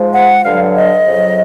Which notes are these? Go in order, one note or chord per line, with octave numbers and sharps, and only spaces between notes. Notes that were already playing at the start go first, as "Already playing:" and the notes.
Already playing: G#2 F3 G#3
F#5
G2 D3 F#3 F5
D#5
F2 C#3 F#3